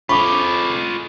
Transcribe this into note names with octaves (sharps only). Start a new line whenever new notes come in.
F2 F4 G#4 B5 C#6 D6